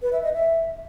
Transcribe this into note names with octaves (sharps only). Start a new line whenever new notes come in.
B4
E5
D#5
E5